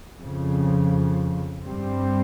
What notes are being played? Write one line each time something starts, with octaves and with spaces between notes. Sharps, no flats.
F2 C#3 F3
G2 G3 C4